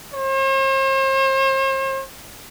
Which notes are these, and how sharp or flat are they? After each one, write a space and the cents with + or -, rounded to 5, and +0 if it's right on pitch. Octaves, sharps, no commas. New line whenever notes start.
C5 +45